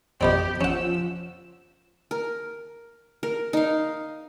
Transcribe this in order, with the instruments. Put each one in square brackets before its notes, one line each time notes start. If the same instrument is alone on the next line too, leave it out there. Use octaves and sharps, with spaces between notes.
[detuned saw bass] F2 [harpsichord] B2 G3 C4 [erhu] G4
[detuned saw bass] F3 [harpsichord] C#4 F#5 [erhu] E6
[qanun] A#4
A#4
D#4 F5